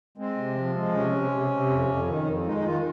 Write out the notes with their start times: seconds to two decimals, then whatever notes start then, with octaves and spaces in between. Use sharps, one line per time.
0.18 G#3 C4
0.37 C3
0.55 F3
0.75 G#3
0.94 C3 C#4
1.13 C3
1.31 C3
1.51 C3
1.70 F2
1.88 F2
2.08 D#3
2.26 F2
2.45 G#3 D#4
2.57 D#4
2.64 D#3 F4